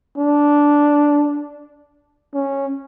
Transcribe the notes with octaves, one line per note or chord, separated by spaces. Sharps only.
D4
C#4